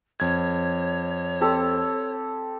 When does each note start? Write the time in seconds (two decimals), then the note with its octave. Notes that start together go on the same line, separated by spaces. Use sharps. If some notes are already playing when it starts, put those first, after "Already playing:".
0.20 F2 C#5 G#6
1.41 C4 G4 A4